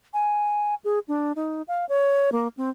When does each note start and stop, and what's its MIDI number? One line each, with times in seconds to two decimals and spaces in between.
0.13 0.75 80
0.84 0.99 68
1.08 1.32 62
1.36 1.62 63
1.68 1.85 77
1.89 2.30 73
2.32 2.48 58
2.57 2.70 60